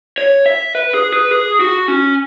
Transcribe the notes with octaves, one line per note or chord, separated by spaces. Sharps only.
C#5
E5
B4
G#4
B4
G#4
F#4
C#4